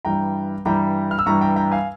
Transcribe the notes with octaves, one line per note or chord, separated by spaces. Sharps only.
G2 E3 G3 G5 A#5
G2 E3 G3 G5 A#5
F6
E6
G2 E3 G3 A#5 C#6
G5 A#5
G5 A#5
F5 G#5